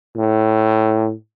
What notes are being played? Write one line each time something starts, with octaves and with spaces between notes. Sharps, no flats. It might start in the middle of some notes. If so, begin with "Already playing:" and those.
A2